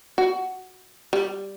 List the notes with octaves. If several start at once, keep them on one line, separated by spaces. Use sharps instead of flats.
F#4
G3